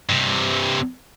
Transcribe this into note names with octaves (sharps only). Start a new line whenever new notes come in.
G2 C3